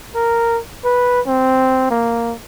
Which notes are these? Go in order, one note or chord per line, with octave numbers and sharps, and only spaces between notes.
A#4
B4
C4
A#3